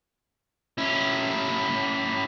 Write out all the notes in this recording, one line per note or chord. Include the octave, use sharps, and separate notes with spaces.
C#4 E4